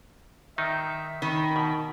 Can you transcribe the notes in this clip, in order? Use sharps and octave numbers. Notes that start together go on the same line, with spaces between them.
D#3 D#4 E5
D#3 B5
B2